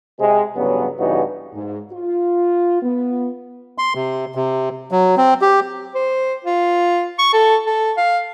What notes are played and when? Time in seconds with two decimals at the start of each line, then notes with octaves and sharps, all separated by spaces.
0.20 C3 G#3
0.56 A1 G2 C#3 F#3 B3
0.99 G2 C#3 E3 B3 D#4 F#4
1.54 G#2
1.93 F4
2.83 B3
3.78 C6
3.95 C3
4.35 C3
4.91 F#3
5.17 C4
5.41 G4
5.95 C5
6.45 F4
7.19 C#6
7.33 A4
7.67 A4
7.97 F5